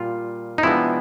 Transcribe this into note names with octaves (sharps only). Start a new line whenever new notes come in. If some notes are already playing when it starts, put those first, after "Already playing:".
Already playing: A#2 G3 F4
D#4
C3 F3 G#3 B3 D4 E4